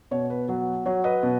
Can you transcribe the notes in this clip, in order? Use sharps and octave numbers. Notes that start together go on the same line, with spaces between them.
B2 C#5
B4
F#3
F#3 C#5
B4 D#5
B2